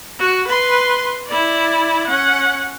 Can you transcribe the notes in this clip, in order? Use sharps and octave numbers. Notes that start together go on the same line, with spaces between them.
F#4
B4 C6
E4 D5
C#4 F#5